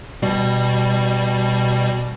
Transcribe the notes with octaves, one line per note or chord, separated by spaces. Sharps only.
B2 G3